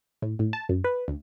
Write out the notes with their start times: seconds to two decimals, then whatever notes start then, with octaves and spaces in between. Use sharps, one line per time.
0.22 A2
0.39 A2
0.53 A5
0.69 F#2
0.84 B4
1.08 D2